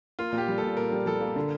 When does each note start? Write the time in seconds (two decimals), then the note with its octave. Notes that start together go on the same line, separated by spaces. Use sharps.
0.19 A#3 F4
0.32 A#2
0.38 G4
0.48 G3
0.58 A#2 A4
0.77 A#2 A#4
0.92 G3
1.06 G3 A4
1.21 A#3
1.36 D3